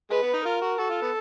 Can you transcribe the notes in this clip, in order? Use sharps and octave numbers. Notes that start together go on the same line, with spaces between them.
G#3 B4
B3
D#4
F4 A#4
F#4
F#4 A4
F4
B3